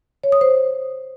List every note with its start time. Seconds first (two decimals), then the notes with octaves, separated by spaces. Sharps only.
0.24 C#5
0.32 D#6
0.41 C5